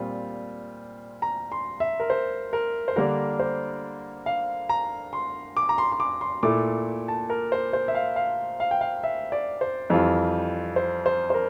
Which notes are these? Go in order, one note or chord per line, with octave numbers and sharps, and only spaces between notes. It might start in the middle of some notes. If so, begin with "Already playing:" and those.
Already playing: A#2 G3 C4 F4
A#5
C6
E5
A#4
C5
A#4
C5
D3 G3 A#3 D4 A#4
C5
F5
A#5
C6
D6
A#5
C6
C6
D6
C6
A#2 A3 E4 D6
A5
A#4
C5
C5
E5
F5
F5
F5
G5
F5
E5
D5
C5
F2 E3 G3 C4 F4
C5
C5
C5
A#4